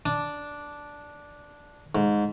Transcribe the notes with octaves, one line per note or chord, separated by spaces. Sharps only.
D4
G#2